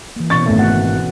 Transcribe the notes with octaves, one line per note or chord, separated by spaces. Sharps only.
E3 A#3
B2 C#4 C#6 A6
G#1 A3
F#5